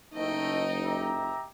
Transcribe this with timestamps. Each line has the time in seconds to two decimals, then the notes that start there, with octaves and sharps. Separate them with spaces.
0.14 F#1 A3 D#4 D#5 G5
0.84 G4 E5 A#5